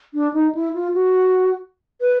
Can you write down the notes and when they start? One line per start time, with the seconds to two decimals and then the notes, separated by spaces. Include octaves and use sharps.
0.14 D4
0.34 D#4
0.55 E4
0.74 F4
0.94 F#4
2.01 B4